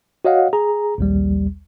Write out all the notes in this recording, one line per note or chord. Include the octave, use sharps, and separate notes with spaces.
F#4 C#5 D#5 F5 F#5
G#4 A#5
A#1 D#2 G3